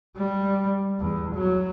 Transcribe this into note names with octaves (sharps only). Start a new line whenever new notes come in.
G3
E2
F#3